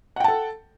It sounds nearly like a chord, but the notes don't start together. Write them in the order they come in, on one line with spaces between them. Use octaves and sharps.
F#5 G5 A5 A4